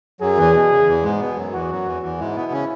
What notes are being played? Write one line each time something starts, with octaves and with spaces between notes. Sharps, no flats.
F#2 F#3 G#4
E2 E3
B2
C#3
E2 E3
G#2 G#3
B2 B3
F#2 F#3
E2 E3 F#4
F#2 F#3
E2 E3
E2 E3
G#2 G#3 E4
B2 B3
C#3 C#4